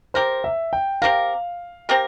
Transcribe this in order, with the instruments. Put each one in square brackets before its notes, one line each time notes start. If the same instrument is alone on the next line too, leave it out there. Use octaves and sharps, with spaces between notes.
[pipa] C4 G4 A#4 [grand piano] C5
[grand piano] E5
G5
[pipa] C4 G4 A#4 [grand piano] F5
[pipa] C4 G4 A#4